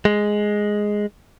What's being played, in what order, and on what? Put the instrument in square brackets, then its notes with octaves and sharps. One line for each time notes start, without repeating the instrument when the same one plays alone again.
[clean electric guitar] G#3